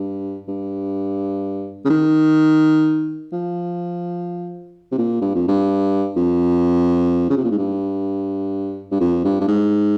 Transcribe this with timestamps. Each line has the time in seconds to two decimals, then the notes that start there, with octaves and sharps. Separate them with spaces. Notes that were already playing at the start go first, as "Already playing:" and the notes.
Already playing: G2
0.48 G2
1.85 C#3
1.90 D#3
3.32 F3
4.92 C3
4.98 A#2
5.21 G2
5.35 F2
5.48 G2
6.16 F2
7.30 C#3
7.37 C3
7.44 A#2
7.51 G#2
7.58 G2
8.91 G2
9.00 F2
9.24 G2
9.41 G2
9.48 G#2